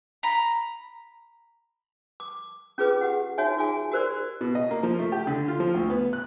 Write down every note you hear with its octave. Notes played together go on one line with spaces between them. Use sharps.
A#5 B5
D6
C#4 F4 G#4 B4 D6
G4 F#5
D#4 F#4 C#5 E5 G#5
F4 G#4 G#5
F#4 G4 A#4 C5 D5
B2
D#5
A#3
F3
A3
G4
D3
F4
F3
D2
B3
F#6